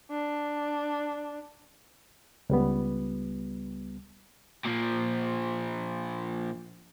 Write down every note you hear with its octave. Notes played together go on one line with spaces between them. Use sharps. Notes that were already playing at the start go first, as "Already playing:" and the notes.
D4
C#2 G3 B3
A#2 F3